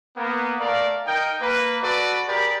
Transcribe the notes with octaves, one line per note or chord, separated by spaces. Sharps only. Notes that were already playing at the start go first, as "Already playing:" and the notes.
A#3 B3
A3 A#4 D5 F5
D#4 A#4 G5
A#3 B4
F#4 A4 B4 D5
G4 G#4 A#4 D5 B5